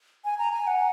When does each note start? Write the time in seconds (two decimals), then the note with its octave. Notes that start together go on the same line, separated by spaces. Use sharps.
0.25 G#5
0.39 A#5
0.53 G#5
0.67 F#5